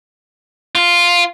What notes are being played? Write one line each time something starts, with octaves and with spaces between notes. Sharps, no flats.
F4